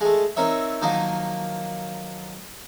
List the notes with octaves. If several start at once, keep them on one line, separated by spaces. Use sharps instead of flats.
G#3 A3
C4 D#4 A#4 C#5 E5
D#3 F3 F#3 A#3 D#4